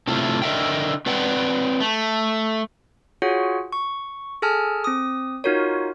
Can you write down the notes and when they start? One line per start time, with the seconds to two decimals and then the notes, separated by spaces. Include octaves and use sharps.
0.07 C3 A3 E4 F4
0.42 D3 A#4 D#5 E5 G5
1.06 C4 B4 D5 F#5 G5
1.80 A3
3.22 F4 F#4 G#4 C#5 F#5
3.72 C#6
4.42 G#4 A4 G#5 A5 F6
4.84 C4 D#6
5.44 D#4 F4 F#4 A#4 C#5